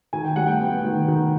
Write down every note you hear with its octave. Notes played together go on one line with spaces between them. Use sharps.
D#3 G#5
G5
G3 F#5
G5
B3
D#3
D#3